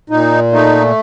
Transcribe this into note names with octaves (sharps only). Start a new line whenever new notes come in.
A#2 D#4
A3 D#4